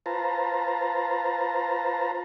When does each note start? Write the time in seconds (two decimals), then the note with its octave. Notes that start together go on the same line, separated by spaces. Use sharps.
0.06 F4 B4 C5 A5 A#5